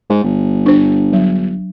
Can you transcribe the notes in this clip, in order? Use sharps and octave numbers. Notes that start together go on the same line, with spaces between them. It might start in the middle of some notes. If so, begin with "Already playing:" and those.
G#2
G1
D4 C5
F#3